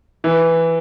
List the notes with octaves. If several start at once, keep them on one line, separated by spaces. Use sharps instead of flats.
E3